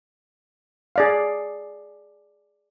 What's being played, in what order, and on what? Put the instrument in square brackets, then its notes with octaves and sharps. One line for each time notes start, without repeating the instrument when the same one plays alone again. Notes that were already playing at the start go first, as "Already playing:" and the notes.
[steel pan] G#4 D5 F5